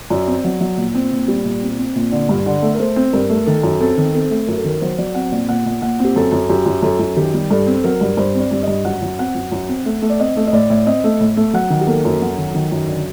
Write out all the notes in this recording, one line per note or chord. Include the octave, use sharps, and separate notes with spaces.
F#2 D5
C4
F#3
F#3
A#2
C4
A#2
G3
A#2
C4
C4
A#2
D3
G2
D3
A3
A#4
A3 C5
C4
G2 A#4
A3
D#3 A4
F#2
C4 A4
D#3
C4 A4
A3
F#2 A#4
A4
D#3 A#4
F#3 C5
F#3 D5
C4 F#5
A#2 D5
A#2 F#5
A#2
A#2 F#5
C4
G4
F#2 A4
F#2
F#2 G4
F#2
F#2 A4
F#2
D#3 G4
G3
G2 A4
C4
F#3 A#4
G2
G2 C5
C4
D5
G2
G2 D#5
F#2 F#5
F#2
C4 F#5
F#2
F#2
C4
A3
A3
D5
C4 D#5
A3
D#5
A2 D5
A2
C4 D#5
A3
A2
A3
F#3 F#5
D#3
G4
A#3 A4
F#2
F#3
D#3
D#3
F#2
D3